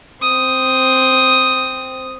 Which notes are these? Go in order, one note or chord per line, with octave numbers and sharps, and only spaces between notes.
C4 D#6